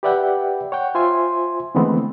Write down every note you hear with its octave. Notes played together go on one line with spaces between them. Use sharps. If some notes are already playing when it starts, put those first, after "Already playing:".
G4 B4 D5 E5 F#5 G5
C#5 F#5 G5
F4 C5 E5 G#5 C6
D3 E3 G#3 A3 B3 C4